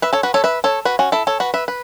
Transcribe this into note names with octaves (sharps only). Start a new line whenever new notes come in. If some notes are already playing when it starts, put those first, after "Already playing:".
B4 E5
A4 C#5
F#4 B4
A4 C#5
B4 E5
A4 C#5
F#4 B4
C#4 F#4
E4 A4
A4 C#5
F#4 B4
B4 E5
B4